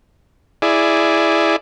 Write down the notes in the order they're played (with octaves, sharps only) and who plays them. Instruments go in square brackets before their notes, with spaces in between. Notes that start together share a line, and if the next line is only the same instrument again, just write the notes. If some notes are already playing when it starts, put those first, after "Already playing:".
[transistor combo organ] E4 G#4 D5